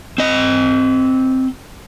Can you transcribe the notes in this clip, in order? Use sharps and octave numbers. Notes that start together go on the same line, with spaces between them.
C4 D#5